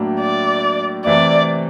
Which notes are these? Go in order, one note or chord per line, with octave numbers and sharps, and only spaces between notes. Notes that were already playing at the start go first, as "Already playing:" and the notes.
Already playing: A2 F#3 A#3 D4
D5
C3 E3 A3 D5